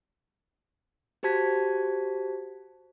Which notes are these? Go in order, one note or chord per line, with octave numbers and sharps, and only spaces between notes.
F#4 G4 C5 A5 G#6 B6